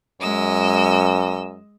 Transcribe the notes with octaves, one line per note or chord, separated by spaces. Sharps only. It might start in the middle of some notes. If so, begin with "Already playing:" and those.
F#2 G#3 D#5 E6